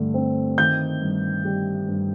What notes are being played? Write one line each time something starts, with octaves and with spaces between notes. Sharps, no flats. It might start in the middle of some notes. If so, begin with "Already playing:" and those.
Already playing: G2 D3 A3
C4
D#3 G6
G2
G3
G2